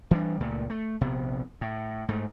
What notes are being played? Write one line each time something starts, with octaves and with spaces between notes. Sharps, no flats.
E3 G3 D4
C#2 A#2 A3
A3
A#1 C3 B3
A2
G#2 A3